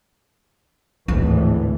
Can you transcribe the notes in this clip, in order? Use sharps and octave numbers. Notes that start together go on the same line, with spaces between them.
G#1 D2 A2 E3